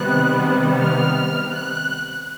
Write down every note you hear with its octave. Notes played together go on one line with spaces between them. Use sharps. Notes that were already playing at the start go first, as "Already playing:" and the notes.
Already playing: C3 D#3 G3 B3 F#6
F6
F#6